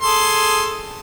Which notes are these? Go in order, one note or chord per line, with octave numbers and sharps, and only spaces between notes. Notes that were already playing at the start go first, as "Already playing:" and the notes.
G#4 A4 C6